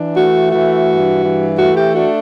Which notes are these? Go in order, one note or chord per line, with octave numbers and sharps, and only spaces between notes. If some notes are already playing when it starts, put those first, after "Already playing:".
Already playing: E3 D4
A3 F#4
E3 F#4
G2
E3
A3 F#4
G4
D4 F#4